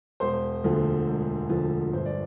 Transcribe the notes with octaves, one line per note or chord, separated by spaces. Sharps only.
E1 C5 C6
D2 D3 F3
E1
D2 D3 F3
G1 C5
D5